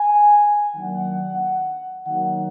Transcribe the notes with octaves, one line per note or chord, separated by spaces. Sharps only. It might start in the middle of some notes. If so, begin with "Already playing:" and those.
Already playing: G#5
D#3 F#3 A#3 D4 F#5
D#3 F#3 A#3 D#4 F#5